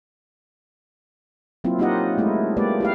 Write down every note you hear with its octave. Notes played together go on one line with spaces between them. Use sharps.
F#3 A#3 C4 E4 F4
A#3 D#4 F4 G4 D#5 F#5
G#3 A3 E4
G#3 A#3 G4 B4 D5
E4 G4 F5